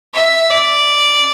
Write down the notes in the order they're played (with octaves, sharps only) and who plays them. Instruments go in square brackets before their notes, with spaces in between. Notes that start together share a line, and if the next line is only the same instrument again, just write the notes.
[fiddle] E5
D5